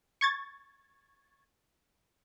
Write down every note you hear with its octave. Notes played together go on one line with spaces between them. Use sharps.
C#6 G#6 A6